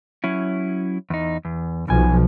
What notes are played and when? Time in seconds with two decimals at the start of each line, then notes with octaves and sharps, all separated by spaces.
0.24 F#3 C#4 E4
1.10 E2 D#4
1.45 E2
1.88 B1 B2 F3 G#5